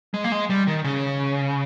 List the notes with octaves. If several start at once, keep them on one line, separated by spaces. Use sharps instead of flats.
G#3
A#3
G#3
G3
D#3
C#3